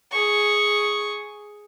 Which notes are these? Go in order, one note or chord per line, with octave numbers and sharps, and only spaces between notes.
G#4 C#6